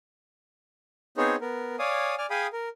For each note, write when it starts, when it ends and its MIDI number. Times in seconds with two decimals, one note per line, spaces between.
1.17 1.36 59
1.17 1.36 60
1.17 1.36 63
1.17 1.36 68
1.17 1.36 72
1.17 1.36 73
1.41 1.76 59
1.41 1.76 70
1.79 2.15 73
1.79 2.15 74
1.79 2.15 77
1.79 2.15 80
1.79 2.15 87
2.18 2.26 74
2.18 2.26 80
2.18 2.26 89
2.30 2.47 68
2.30 2.47 77
2.30 2.47 79
2.30 2.47 80
2.30 2.47 83
2.30 2.47 87
2.53 2.69 70